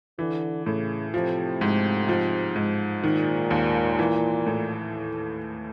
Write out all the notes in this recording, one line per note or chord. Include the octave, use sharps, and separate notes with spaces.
D3 E3
A2 C#3
C3 F3
G#2
F3
G#2
A#2 D#3
D#2
E3
A2